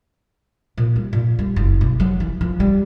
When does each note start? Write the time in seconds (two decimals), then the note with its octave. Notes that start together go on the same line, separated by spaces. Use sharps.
0.78 A#2
0.96 G3
1.13 A#2
1.39 G3
1.56 F#1
1.81 B1
2.00 F#3
2.20 E3
2.41 F3
2.60 G3